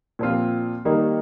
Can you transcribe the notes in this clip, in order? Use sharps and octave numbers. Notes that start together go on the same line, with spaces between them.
A#2 F3 C4 F4
D#3 G3 A#3 D#4